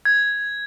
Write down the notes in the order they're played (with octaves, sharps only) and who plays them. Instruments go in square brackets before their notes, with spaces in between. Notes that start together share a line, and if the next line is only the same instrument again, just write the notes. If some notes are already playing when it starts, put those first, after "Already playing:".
[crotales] G#6